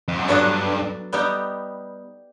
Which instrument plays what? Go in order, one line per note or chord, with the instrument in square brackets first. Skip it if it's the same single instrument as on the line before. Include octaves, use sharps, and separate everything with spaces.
[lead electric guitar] F2
F#2
[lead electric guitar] G2 [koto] F#3 B3 D4 F#4 A4
[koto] G3 B3 D#4 G4